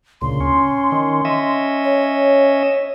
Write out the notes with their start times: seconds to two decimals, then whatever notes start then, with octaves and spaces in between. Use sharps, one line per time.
0.22 D2 A#2 C#3 C6
0.40 C#4
0.92 D#3 C#4
1.25 C#4 D#5 E5
1.84 C#5